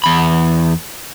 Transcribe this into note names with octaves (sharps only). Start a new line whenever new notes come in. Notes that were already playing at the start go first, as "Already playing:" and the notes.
E2 B5